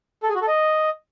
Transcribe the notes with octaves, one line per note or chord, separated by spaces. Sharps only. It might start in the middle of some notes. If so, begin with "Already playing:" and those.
A4
G#4
F#4
A4
D#5